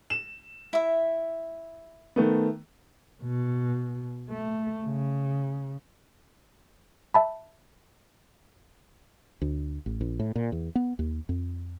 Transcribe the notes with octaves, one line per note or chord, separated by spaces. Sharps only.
E7
E4 E5
D#3 A3 B3
B2
A3
C#3
E5 A5 B5
D2
A1
A#1
A2
A#2
E2
B3
D#2
F2